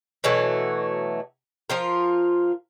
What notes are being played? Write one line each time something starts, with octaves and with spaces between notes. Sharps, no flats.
B2 E3 F#3 A3
F3 F4 A#4